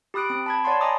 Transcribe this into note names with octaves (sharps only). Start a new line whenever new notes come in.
G4 B5 D#6 F#6 D7
C4 D7
A5 B5 G#6
C#5 D5 F#5 A5 C6
D#5 G#5 A#5 B5 D6 D#6